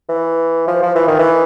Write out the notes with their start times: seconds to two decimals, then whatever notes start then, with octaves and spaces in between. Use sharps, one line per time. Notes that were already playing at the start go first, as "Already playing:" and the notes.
0.09 E3
0.67 F3
0.83 F3
0.95 E3
1.08 D#3
1.19 E3